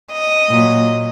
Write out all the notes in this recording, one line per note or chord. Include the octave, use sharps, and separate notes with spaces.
D#5
A#2 F#3